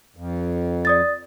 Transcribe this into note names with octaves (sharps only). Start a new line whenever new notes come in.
F2
D5 D#6 A6